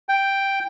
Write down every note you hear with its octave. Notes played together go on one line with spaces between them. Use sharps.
G5